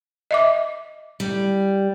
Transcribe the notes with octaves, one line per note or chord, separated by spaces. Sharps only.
D#5 E5 D6
G3